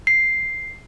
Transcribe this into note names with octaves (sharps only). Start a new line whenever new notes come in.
C7